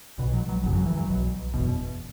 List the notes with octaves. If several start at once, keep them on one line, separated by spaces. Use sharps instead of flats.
B1 B2
F#3
F#3
G#1 F#2 C#3 F#3
F#3
E3
F#3
B1 B2
F#1 E2 B2